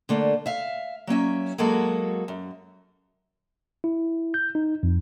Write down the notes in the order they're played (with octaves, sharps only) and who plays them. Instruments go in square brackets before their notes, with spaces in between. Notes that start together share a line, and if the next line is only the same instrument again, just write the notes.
[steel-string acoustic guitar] D3 A3 A#3 D4
E5 F5
F#3 A#3 C#4 E5
F#3 G#3 A#3 F#4 A4
F#2
[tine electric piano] E4
G6
D#4
F2